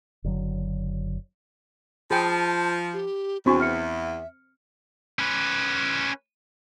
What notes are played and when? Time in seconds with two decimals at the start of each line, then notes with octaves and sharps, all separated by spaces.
0.24 F#1 D3 F#3
2.11 F3 G#4 G5 A5 B5
2.93 G4
3.46 E2 C4 D4 F#4 G#5 C#6
3.60 E5 F6 C#7
5.19 C#4 B4